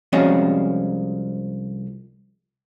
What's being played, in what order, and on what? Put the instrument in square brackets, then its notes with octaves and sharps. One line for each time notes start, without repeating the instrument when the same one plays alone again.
[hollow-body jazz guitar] C2 F3 G#3 C4 C#4 F#4